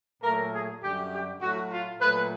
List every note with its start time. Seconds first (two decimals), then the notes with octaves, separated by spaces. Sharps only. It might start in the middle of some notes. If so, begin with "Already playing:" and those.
0.23 A#2 F#3 A3 A#4
0.54 G#4
0.83 F#2 D3 G3 G4
1.12 G4
1.42 A2 F#3 A3 F#4
1.72 F4
2.01 A#2 F#3 A3 B4